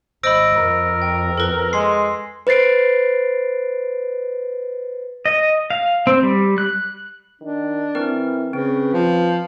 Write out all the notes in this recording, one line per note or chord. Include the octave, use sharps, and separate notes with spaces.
G#1 C5 D#5 B5 E6 A#6 D7
F2 A#4
G5
A4 B4
G#3 C6 C7
B4 C5 A6 C7 D7
D#5
F5
C4
G3
F#6
D#3 D4
E3 C4 A#4
C#3 C4 B4
F3